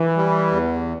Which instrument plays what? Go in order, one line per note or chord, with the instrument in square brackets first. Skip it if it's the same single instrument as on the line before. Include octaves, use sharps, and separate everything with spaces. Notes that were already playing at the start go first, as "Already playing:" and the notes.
Already playing: [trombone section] E3
[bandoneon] G3
E2